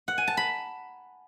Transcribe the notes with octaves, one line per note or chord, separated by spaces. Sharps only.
F#5
G#5
A5
B5